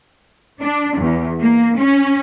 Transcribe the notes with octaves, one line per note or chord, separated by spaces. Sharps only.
D4
E2
A#3
C#4